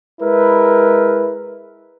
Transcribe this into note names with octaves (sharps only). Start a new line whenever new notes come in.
G#3 E4 A#4 B4